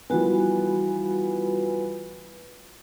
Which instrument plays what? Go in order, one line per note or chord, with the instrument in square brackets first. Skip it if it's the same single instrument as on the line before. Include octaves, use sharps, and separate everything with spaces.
[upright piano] E3 F3 B3 [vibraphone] G3 F#4 G#5